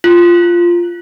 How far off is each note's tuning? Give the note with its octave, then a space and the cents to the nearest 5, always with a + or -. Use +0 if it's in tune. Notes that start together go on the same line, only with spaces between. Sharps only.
F4 -10